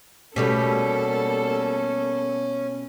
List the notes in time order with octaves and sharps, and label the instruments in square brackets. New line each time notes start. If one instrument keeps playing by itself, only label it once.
[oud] B2 G3 A3 [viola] A#3 A4 [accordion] C#4